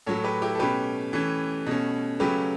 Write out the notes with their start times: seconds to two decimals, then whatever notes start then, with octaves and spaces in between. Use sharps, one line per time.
0.06 A2 F#3 A3 A4 C#5
0.24 G4 B4
0.42 E4 G4
0.55 A4
0.59 B2 A3 C#4 G4 B4
1.13 E3 A3 C#4
1.67 B2 A3 C#4
2.20 C#3 F#3 A3 C#4 G4 B4